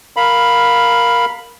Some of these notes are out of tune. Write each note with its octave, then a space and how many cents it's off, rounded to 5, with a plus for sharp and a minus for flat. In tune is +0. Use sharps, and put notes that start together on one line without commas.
A#4 +0 F5 +10 B5 +0